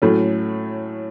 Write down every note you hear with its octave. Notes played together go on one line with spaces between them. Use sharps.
A2 F#3 A3 C#4